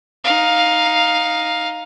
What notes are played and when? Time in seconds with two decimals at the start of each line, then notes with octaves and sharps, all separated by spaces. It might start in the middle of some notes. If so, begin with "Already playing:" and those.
0.24 D#4 F5